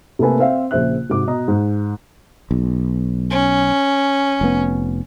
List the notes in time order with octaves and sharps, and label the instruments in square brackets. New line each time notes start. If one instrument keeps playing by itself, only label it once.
[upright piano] C3 A3 A#3 A4 B4 G#5
C4 C5 E5 F5 G5
A#1 C#3 C5 E5 F#6
G#2 C3 F#4 D6
B2 D#5 A#5 D#6
G#2
[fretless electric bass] B1
[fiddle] C#4
[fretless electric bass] F1 B3